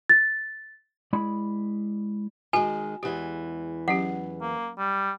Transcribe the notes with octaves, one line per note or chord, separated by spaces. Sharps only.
A6
G#3 E4 D5 B5
D#3 G#3 F#4 G#5
E2 E3 G#3 G4
F#3 C#4 G4 F#5
A#3
G3